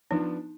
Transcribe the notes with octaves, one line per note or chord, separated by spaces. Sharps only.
F3 B3 D4 D#4